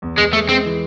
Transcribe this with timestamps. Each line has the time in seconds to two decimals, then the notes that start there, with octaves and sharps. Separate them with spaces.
0.02 E2
0.18 E2 G#3
0.33 G#3 A3
0.49 G#3 C4
0.66 E3